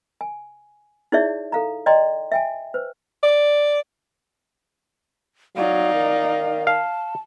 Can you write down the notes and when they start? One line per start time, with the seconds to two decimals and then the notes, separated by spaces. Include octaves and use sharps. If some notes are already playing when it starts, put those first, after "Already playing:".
0.21 G#5
1.12 D#4 E4 G#4 C#5 D5 E5
1.52 A4 F5 A#5
1.86 D5 D#5 G5 A#5 C6
2.32 E5 G5 G#5
2.74 B4 C5
3.23 D5
5.56 F#3 D#4 D5 F5
5.93 D#3
6.67 F5 A5